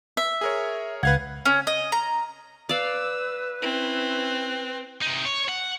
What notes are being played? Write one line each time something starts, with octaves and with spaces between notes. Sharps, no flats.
E5
G#4 A#4 C#5
C#2 B4 F5 F#5 G#6
C#4
D#5
A#5
B4 D5 F5 E6
C4 C#4 E4
C3 D#4
C#5
F#5